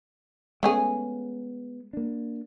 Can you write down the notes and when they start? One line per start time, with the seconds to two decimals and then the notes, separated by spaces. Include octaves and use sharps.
0.63 G#3 A3 B3 C#4 G#4
1.93 A#3 D4